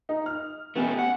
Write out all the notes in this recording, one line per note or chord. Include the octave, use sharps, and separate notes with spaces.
D#4
F6
B2 A3 B3 C#4 G4
F#5